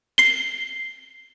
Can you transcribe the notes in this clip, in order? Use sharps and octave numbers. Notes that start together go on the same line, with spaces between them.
C7 G7